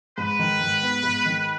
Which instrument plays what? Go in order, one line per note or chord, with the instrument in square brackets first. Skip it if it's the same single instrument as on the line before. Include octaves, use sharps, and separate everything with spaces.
[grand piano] G#2 [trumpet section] B4
[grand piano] D#3
G#2
B3
G#2
D#3